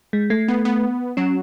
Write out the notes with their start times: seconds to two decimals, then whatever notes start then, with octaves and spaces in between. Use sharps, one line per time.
0.13 G#3
0.30 A3
0.48 B3
0.65 B3
1.17 F#3 C#4